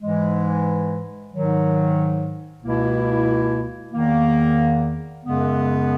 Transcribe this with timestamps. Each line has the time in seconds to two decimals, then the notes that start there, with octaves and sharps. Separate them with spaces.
0.01 G#2 E3 G#3
1.32 G#2 D#3 F#3
2.62 C#2 B2 A#3 E4
3.92 E2 D#3 A#3
5.23 F#2 C#3 G#3 B3